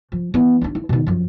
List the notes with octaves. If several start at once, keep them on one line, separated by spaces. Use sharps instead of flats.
F3
E3 B3
D4 F4
E4
B2 D#3
F#2 F3